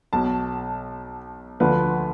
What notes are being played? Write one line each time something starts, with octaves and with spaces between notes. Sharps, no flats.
B1 B2 A5
D2 D3 F3 B4